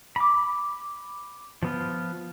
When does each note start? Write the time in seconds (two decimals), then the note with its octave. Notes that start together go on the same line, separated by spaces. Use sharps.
0.16 B5 D6
1.63 F3 B3 F4